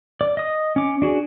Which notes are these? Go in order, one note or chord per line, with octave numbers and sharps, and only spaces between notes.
D5
D#5 D#6
C#4 D6
D4 F#4 G#4